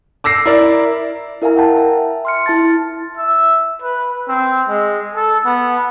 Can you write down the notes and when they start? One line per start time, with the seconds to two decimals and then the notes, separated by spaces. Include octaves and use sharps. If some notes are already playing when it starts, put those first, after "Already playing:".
0.24 D6 E6 A#6 C7
0.46 E4 A#4 D5
1.42 E4 A#4 E5 F5 G#5 A#5
1.56 F#5 G5 A5 A#5
1.77 E5 A#5
2.25 C6 F6 C#7
2.46 E4 A5 A6
3.17 E5
3.82 B4
4.28 C4
4.69 G#3
5.15 A4
5.45 B3